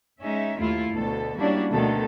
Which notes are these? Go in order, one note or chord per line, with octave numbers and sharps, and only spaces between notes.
G#3 C#4 D#4 E5
D#2 A3 E4 F4 F5
D2 B2 A4
G3 A#3 C#4 D4 E4 F#4
D2 B2 D3 D#3 A3 A4